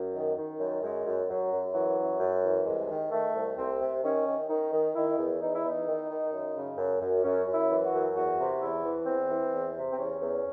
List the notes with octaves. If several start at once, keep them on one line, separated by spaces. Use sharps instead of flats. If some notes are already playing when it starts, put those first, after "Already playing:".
Already playing: F#2
D#3
D#3
F#2
F#2 G#3
F#2
F#2 F#3
F#2
E3 F#3
F#2
F#2
E3
C2 G#3
D#3
D#3 A3
C2
C2 C4
C3
D#3 C#4
D#3
D#3 D#4
D#3
D#3 E4
E2
E2 D#4
E4
E2 D#4
D#3
D#3
F#2
C#3
F#2
F#2
F#2 C#4
F#2
E4
E3
F#4
F#2
E2 F#4
C3
E2 E4
E3
E2 C4
E3
E2
C3
C4
E2 C#4
E2